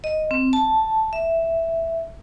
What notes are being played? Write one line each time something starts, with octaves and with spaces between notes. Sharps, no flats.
D#5
C4
A5
E5